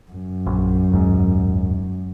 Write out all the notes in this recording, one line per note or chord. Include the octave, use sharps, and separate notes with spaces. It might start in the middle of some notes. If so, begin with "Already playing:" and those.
F#2
A#1
D#1 G#2